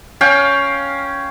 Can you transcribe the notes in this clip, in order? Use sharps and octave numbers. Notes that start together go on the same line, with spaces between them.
C#4 F5 G5 G#5